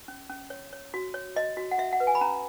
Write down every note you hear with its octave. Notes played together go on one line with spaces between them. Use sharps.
C#4
C#4
C#5
C#5
F#4
C#5
F#4 D#5
F#4
F#5
F#4 E5
F#5
B4
G#5
B5
C#4 A#5